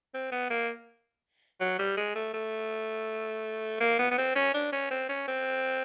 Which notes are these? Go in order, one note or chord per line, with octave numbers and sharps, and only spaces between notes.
C4
B3
A#3
F#3
G3
G#3
A3
A3
A#3
B3
B3
C4
C#4
D4
C#4
C4
C#4
C4